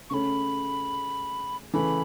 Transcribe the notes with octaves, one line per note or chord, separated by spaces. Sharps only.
C#3 A3 C#4 B5 C#6
C#3 E3 A3 B5